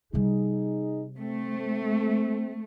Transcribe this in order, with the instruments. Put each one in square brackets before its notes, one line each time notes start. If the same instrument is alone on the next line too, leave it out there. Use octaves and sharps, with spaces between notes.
[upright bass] C3 G3 [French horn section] D#4 G#4
[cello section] A3 [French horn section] C4